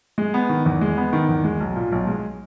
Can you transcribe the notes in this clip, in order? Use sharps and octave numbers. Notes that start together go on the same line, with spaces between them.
G#3
B3
D#3
E2
G#3
B3
D#3
E2
G#3
B1
A#2
B1
G#3